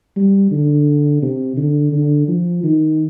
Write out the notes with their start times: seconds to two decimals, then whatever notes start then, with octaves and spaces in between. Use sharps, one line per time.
0.16 G3
0.51 D3
1.22 C3
1.57 D3
1.92 D3
2.28 F3
2.63 D#3